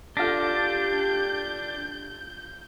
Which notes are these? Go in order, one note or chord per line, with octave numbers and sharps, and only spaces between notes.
D4 F4 G4 A4 G6 A#6